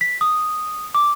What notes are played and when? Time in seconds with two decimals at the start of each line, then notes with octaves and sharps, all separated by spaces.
0.01 B6
0.21 D#6
0.95 D6